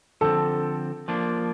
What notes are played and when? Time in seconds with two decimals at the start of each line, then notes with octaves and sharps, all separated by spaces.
0.21 D3 F3 C4 A4 A5
1.08 F3 A#3 D4